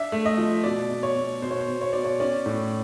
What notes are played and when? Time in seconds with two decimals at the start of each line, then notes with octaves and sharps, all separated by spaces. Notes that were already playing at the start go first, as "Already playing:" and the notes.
Already playing: D4 E5
0.12 A3
0.26 D#5
0.38 F3
0.64 B2 D5
0.90 B2
1.03 C#5
1.16 B2
1.42 B2 C5
1.51 C#5
1.59 C5
1.68 B2
1.81 C#5
1.93 B2 D5
2.04 C#5
2.20 C#4 D5
2.46 A2